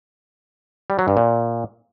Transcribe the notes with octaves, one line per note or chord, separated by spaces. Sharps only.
G3
F#3
G2
A#2